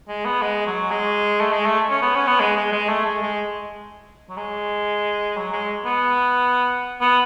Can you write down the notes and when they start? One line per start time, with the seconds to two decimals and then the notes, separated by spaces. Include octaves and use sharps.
0.08 G#3
0.25 B3
0.42 G#3
0.66 F#3
0.91 G#3
1.41 A3
1.52 G#3
1.66 A3
1.90 C#4
2.02 B3
2.15 C#4
2.27 B3
2.40 G#3
2.56 G#3
2.72 G#3
2.89 A3
3.05 G#3
3.22 G#3
4.29 F#3
4.37 G#3
5.37 F#3
5.52 G#3
5.86 B3
7.01 B3